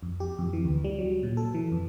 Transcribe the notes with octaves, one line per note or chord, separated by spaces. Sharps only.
F2
G4
F2
E3
D2
G3
F#3
A#2
A4
E3
F2